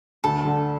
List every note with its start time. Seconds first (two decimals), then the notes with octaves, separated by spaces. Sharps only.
0.24 D2 A4
0.45 D3